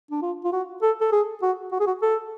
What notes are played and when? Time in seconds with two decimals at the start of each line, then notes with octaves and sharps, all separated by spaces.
0.11 D4
0.22 F4
0.44 F4
0.52 F#4
0.82 A4
1.01 A4
1.12 G#4
1.42 F#4
1.72 F#4
1.80 G#4
1.87 F#4
2.02 A4